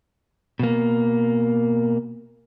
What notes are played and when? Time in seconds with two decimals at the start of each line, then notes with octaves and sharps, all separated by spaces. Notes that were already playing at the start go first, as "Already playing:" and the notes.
0.59 B2 A#3